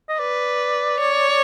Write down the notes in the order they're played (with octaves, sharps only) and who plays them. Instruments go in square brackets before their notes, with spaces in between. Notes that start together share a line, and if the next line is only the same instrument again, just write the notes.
[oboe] D#5
[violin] B4 [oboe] D5
[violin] C#5